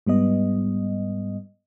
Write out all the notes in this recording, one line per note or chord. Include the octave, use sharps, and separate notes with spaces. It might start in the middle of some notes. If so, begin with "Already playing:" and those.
G#2 G3 B3 D#5